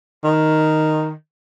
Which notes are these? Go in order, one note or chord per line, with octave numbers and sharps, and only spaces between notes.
D#3